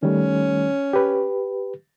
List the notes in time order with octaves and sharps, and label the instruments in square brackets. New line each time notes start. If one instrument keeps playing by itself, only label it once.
[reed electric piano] D#3 G3 A3 [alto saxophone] C#4
[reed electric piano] G4 B4